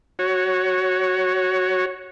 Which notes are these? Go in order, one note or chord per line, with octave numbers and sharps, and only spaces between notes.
F#4 C#5